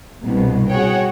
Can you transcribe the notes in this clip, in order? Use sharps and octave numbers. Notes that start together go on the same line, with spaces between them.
C2 G2 B2
F#4 G#4 C#5 F#5 G5